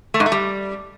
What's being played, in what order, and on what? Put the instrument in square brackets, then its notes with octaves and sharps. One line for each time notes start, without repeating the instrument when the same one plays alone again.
[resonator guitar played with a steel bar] A3
G#2
A3
G3